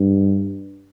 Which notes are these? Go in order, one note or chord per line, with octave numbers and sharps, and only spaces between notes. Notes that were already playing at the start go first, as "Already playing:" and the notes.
Already playing: G2